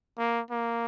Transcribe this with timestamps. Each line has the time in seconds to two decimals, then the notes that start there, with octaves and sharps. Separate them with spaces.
0.18 A#3
0.51 A#3